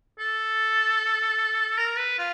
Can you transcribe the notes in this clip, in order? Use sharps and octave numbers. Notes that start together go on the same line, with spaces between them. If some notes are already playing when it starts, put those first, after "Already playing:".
A4
A#4
B4
F4